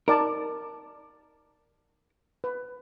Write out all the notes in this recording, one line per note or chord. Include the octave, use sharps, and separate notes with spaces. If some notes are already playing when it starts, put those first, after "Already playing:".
D#4 A#4 D5 A5
B4